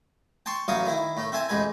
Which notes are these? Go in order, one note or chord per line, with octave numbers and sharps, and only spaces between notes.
G5 A5 C6 C#6
A1 E3 F#3 F5 C#6 D#6
D#3 E4
A2 A3
C4 E5 G#5 A5
A1 F2 G#3 B4 G#5